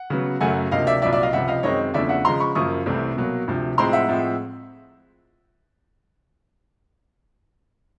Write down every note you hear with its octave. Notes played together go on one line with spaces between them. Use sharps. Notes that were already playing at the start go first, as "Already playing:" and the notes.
Already playing: F#5
C#3 F#3 B3
F#2 C#3 F#3 A3 F#5 G#5
D2 C3 F3 A#3 D#5 F5
D5 E5
C2 A#2 F#3 D5 E5
D5 E5
D#5 F5
C#2 C3 F3 E5 F#5
D#5 F5
F#2 D#3 G#3 C4 D#4 C#5 D#5
E2 C#3 F3 A3 D4 D5 E5
E5 F#5
C#3 F3 G#3 A#5 C6
B5 C#6
F#2 C#3 F3 A#3 C#6 D#6
C2 C3 E3 A3 C4
B2 F#3 A#3
D2 C3 F3
A2 F3 G#3 C4 E4 A#5 C6
E5 F#5
A2 F3 G#3 C4